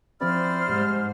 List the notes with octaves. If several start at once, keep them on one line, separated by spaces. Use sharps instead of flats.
F3 C4 E4 C5 D5 F6
G#2 G3